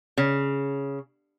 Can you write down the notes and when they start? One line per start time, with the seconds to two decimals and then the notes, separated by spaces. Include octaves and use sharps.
0.18 C#3